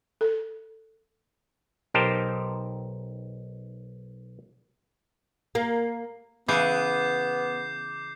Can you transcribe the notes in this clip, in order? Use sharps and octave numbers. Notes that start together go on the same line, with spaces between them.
A4
B1 D#4 G4 A#4 C5 A5
A#3
C#3 E3 B3 G#4 D6 G6 C7